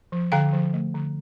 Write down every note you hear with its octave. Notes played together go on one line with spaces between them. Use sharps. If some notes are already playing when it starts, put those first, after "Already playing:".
F3
D3 F5 G5
F3
A3
D3